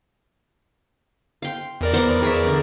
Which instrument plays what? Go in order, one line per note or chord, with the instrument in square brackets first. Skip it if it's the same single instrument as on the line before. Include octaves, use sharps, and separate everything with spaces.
[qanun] F5 G5 C6
[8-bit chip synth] E2 A#4 D5
[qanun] B3 C5 F#5
G#4 C#5 E5
D3